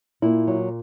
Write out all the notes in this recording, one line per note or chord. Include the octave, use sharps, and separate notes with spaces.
A#2 E4
F#3